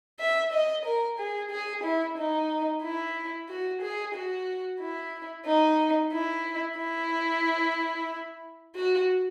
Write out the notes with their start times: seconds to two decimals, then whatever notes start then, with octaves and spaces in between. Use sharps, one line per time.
0.19 E5
0.52 D#5
0.85 A#4
1.19 G#4
1.51 G#4
1.84 E4
2.18 D#4
2.83 E4
3.49 F#4
3.81 G#4
4.14 F#4
4.80 E4
5.46 D#4
6.12 E4
6.77 E4
8.76 F#4